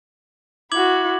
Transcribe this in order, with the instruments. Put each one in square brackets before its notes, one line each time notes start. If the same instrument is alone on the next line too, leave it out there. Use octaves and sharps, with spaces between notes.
[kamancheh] E4 F#4 [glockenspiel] D6 G#6 F#7